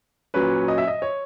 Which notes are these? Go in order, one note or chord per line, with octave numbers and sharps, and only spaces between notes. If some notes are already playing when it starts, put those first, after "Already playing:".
A#2 F#3 C#4 B4
D#5
E5
D#5
C#5